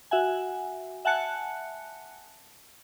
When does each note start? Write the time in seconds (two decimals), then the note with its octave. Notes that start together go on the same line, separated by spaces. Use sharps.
0.11 F#4 E5 F#5 G#5
1.05 E5 F#5 G#5 A5 F#6 C#7